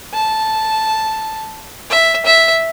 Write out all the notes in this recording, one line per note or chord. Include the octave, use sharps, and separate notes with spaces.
A5
E5
E5